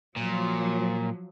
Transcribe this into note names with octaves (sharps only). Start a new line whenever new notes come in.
A#2 F3 F#3